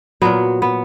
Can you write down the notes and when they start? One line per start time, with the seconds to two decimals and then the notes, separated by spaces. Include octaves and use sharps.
0.22 A#2 F#3 B3
0.62 B3